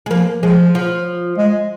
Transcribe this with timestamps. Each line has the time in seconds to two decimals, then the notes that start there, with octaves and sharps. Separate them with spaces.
0.06 G#3
0.11 F3 A#3
0.42 F3 G#3
0.75 F3
1.38 G#3